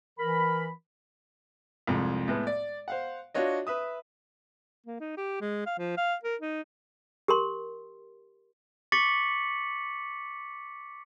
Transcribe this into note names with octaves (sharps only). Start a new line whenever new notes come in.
E3 A#4 B5
C2 F2 G#3
A2 G#3 B3
D5
C5 F5 F#5
D4 F4 F#4 C#5 D#5
B4 E5 D#6
A#3
D#4
G4
G#3
F5
F3
F5
A#4
D#4
G4 A#4 C6
C#6 D6 A6 B6 C#7 F#7